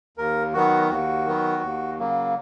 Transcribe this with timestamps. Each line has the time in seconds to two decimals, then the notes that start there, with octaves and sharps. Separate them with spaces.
0.18 D#2 A#4
0.54 D#3 F#3 B3 F#4
0.90 D#2 F#4
1.26 D#3 F#3 B3
1.63 D#2
1.99 C#3 F#3 A#3